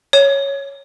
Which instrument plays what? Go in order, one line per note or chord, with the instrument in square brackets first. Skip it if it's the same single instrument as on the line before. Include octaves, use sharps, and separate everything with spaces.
[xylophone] C#5